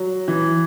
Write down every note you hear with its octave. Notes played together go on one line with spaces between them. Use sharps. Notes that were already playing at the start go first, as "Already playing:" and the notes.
Already playing: F#3
E3